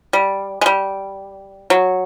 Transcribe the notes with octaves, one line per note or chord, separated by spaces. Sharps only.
G3
G#3
G3
F#3